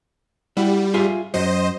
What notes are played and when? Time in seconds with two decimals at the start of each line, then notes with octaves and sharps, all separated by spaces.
0.57 G3 E4 F#4
0.94 F4 G#4 E5
1.34 F#2 F#3 C5 D#5